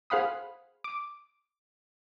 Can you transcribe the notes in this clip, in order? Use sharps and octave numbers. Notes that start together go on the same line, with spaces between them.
G#4 C5 F5 F#5 B5 D#6
D6